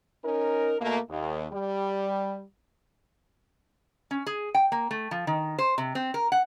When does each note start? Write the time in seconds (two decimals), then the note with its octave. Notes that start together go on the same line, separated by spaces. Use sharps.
0.24 C#4 D#4 A#4
0.81 B2 A3 A#3
1.10 D#2
1.52 G3
4.11 C#4
4.27 G#4
4.55 G5
4.72 A#3
4.91 A3
5.11 F3
5.27 D#3
5.58 C5
5.78 C3
5.95 C4
6.14 A#4
6.32 F#5